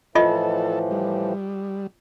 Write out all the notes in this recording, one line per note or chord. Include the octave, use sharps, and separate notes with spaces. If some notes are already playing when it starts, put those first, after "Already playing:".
A2 E3 F3 F4 A4 D#5
G3